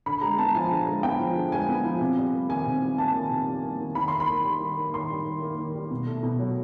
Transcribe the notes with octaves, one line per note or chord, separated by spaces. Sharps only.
D3 B5
G#3 A#5
B3 A5
F3 G#5
D3
G#3
B3 G5
F3
D3
G#3 G#5
B3
F3
C3
G3
A#3
D#3 G#5
C3
G3
A#3 A5
D#3
C3
G3
A#3
D#3
D#3 B5
A#3 C6
B5
D#3
G3
D#3
A#3
D#3 C6
G3
D#3
A#3
D#3
G3
B2
A3
B2
F#3